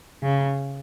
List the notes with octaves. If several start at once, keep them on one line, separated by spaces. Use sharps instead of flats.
C#3